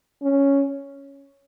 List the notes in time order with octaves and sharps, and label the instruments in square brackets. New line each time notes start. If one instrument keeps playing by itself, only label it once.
[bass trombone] C#4